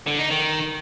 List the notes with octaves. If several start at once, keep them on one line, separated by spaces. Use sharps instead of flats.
D3
D#4
D#3